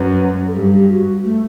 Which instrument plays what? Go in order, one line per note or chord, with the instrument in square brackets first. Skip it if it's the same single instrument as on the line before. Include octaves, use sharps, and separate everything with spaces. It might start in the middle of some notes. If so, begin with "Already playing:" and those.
Already playing: [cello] F#2 [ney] B4
[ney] A4
[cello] G2 [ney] G4
[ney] G4
F#4
A3